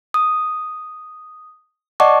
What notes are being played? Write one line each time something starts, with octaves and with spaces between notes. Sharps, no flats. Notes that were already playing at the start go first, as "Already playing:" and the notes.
D#6
D5 D#5 F#5 A5 C#6 D6